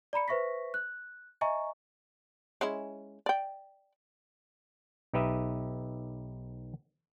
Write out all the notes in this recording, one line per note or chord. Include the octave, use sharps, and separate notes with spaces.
D5 A#5 B5 C#7
B4 C5 E5 C#6 A#6 B6
F#6
D#5 E5 G#5 A#5 C#6
G#3 C#4 E4
D5 G5
B1 D#4 G4 B4 D#5 E5